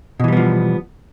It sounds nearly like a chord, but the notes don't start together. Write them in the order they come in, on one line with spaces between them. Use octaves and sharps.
B2 E3 G3 B3 F3